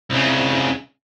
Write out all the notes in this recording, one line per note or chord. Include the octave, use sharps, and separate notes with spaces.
C2 C#3